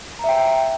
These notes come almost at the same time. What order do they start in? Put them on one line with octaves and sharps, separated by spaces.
A#5 E5 G5